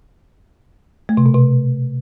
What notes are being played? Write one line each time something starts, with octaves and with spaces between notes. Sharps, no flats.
A3
C3
B2
C3